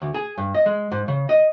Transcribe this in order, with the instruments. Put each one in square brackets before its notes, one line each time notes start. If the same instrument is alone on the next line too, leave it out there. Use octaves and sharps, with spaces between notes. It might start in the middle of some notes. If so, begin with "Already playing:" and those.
[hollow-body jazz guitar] D2
G#4
G2
D#5
G#3
G#2
C#3
D#5